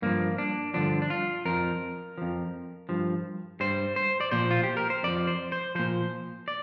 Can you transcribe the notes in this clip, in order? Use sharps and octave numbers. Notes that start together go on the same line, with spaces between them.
G2 F3 A#3
D4
G2 D3 F3 D4
D4
F4
F2 F3 A#4
F2 F3
G2 F3
G2 G3 C5
C5
D5
A#2 F3 C5
F4
G4
A#4
C5
F2 F3 D5
C5
C5
A#2 F3 C5
D5